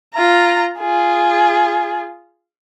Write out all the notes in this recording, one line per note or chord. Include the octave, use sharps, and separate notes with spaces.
F4 A#5
F4 G#4